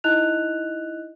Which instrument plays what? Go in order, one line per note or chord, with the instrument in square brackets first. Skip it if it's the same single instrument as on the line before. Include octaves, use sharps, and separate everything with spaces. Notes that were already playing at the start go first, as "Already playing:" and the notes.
[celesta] D#4 E4 D#5 F#6 F7